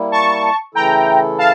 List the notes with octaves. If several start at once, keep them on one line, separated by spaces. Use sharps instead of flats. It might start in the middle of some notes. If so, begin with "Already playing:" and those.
Already playing: G3 A#3 E4
A5 C#6
C#3 E3 A3 E4 A4 G5 A#5
F5 A5